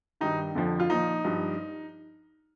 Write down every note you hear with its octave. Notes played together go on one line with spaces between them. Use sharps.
G2 D#3 D#4
F2 D3 F3
F4
A#2 F3 D#4
G2 F3